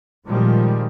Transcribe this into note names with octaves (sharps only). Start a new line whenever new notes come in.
A#2 D#3 F3 G3 G#3